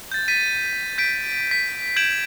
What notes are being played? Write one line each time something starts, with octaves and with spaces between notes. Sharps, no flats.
G6 A6
A6 B6 D#7
G6 B6 D7
B6
G6 G#6 B6 D7 E7 F#7